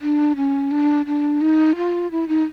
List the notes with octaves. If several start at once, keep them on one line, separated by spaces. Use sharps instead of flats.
D4
C#4
D4
D4
D#4
F4
E4
D#4